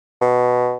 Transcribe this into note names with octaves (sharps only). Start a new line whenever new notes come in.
B2